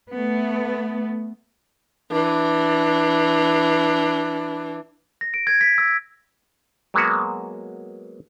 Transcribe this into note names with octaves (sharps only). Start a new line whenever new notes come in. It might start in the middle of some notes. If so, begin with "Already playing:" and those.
A3 B3
E3 D4
A#6
D7
G#6
B6
E6
F#3 G#3 A#3 B3 F#4